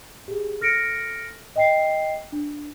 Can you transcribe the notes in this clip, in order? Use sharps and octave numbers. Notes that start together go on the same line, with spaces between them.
G4 G#4
A4 F6 A#6 C#7 D7
D#5 G5 C7
D4